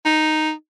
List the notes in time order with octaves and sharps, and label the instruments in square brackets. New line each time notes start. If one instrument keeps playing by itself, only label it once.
[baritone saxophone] D#4